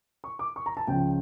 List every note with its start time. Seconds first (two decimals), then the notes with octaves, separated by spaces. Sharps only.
0.24 C#6
0.39 D6
0.56 C#6
0.66 A#5
0.77 A5
0.87 C#2 C#3 F3 G5